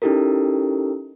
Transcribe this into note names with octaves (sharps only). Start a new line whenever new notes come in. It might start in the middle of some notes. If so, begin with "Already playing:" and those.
C#4 D#4 E4 G4 A4 A#4